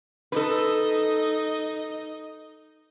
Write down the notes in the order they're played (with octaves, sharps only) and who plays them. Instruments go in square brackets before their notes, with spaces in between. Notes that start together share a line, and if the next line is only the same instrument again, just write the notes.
[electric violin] D#4 D#5 [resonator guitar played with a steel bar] A4 B4